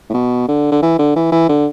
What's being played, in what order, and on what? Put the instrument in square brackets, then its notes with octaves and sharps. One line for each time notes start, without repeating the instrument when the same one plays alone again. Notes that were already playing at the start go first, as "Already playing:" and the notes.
[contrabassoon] A2
B2
D3
D3
E3
D3
E3
E3
D3